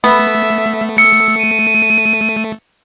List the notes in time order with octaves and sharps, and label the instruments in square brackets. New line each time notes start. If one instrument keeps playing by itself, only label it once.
[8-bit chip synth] A3 [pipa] B3 [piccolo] E5
[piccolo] E6 [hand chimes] C#7
[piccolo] D#7